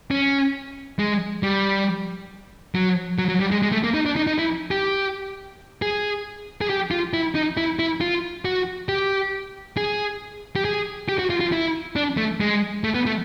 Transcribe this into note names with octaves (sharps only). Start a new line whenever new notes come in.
C#4
G#3
G3
F#3
F#3
F#3
G3
G#3
G#3
A3
A#3
D#4
D4
D#4
D#4
E4
G4
G#4
G#4
G4
F4
E4
D#4
E4
E4
F4
F#4
G4
G#4
G4
G#4
G4
F#4
F4
F4
E4
D4
A3
G#3
A3
B3
A3